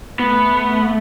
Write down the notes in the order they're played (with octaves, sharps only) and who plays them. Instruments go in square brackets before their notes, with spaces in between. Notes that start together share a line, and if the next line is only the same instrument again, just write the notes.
[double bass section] A3 [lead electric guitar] B3